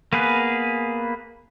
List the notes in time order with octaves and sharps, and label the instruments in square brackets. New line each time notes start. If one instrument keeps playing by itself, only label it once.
[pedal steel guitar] A#3 B3 G#4 B4